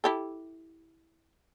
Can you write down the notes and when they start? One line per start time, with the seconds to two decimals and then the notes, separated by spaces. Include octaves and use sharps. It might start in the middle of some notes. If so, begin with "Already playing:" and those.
0.04 E4 G4 A4